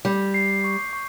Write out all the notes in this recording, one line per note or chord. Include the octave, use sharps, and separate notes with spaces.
G3 G6
C7
C#6
C#6